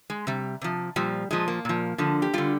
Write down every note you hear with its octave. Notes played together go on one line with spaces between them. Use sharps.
G#3
C3 G3
C3 F3
A#2 F3 G3
A#2 F3 G#3
A#3
A#2 F3
D3 F3
G4
D3 G3 F4